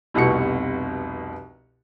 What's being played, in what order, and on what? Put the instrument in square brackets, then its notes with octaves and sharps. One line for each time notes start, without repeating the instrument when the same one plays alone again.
[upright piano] F1 C2 B2 F#4 C#7